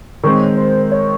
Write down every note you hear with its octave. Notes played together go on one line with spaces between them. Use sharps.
D#3 G#3 C4 C#5
C5
C#5